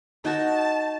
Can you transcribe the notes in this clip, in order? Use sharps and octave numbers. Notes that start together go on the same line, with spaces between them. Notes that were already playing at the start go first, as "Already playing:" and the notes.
D#4 F#4 A#4 A5